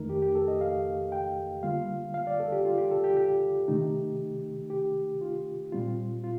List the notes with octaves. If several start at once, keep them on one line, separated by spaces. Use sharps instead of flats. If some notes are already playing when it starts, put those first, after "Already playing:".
Already playing: F2 D#3 A3 D#4 A#4
G4
G4
A4
D#5
F5
G5
D3 G3 A#3 F4 F5
F5
D5
A4
G4
F4
G4
A4
G4
G4
C3 D#3 A3 D#4
G4
F4
A#2 G3 C4 F4
F4